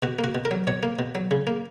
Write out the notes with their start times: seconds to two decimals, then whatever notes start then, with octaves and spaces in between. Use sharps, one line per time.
0.03 B2 F#4
0.19 A#3
0.24 F#4
0.35 B2
0.45 A#4
0.51 F#3
0.67 B2 C#5
0.83 A#3
0.99 B2
1.15 F#3
1.31 C#3
1.47 A#3